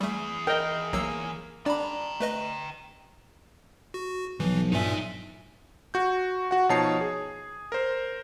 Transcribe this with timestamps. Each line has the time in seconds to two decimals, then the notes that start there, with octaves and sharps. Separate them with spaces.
0.01 E3 G3 A3 G#4
0.47 A#4 D#5 G5
0.93 B1 F#3 A#3 E6
1.66 D4 D5 G5 A#5 B5
2.20 A3 B4 D#5
3.94 F#4
4.40 B1 E3 F3
4.72 G2 A#2 D#4 E5 G#5
5.94 F#4 G6
6.51 F#4 F#5
6.69 B2 F3 D#4 C#5 A5 C7
7.01 G#4
7.72 A#4 C5